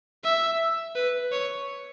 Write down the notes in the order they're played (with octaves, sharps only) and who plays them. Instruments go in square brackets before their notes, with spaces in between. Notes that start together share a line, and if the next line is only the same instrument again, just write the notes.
[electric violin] E5
B4
C#5